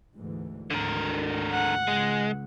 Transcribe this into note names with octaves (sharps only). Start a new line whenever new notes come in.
D2 G#2 E3
G#1 D2 G#2 D3 A#4
F#5
C#2 G#3